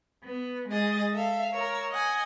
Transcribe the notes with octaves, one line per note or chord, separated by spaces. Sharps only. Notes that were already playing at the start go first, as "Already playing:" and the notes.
B3
G#3 G#4 D#5 A6
A4 E5 F5
A#4 C#5 E6
D#5 F#5 G#5